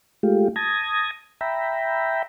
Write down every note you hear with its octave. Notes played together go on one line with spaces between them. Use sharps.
G#3 A3 F4 G4
A5 D#6 G#6 A#6
E5 G5 A#5 B5